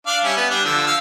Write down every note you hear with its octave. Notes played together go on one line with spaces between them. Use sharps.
D4 D5 F5
G3 C#4 E5
B3
G3 D4
D3 F3 E6
F5 E6